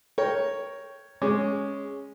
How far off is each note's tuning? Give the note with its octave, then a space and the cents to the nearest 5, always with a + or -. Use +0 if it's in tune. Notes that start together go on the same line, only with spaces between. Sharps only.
A#4 +0 C#5 +0 G5 +0
G#3 +0 C#4 +0 D6 +0